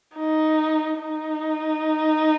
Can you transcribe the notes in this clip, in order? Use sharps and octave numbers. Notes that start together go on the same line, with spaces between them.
D#4
D#4